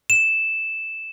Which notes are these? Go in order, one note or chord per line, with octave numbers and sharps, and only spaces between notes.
E7